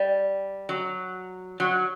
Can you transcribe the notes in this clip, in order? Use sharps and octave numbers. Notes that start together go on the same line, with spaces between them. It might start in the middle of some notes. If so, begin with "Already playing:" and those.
Already playing: G3
F#3
F#3